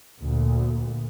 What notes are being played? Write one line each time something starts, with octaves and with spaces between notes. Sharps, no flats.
D2 A#2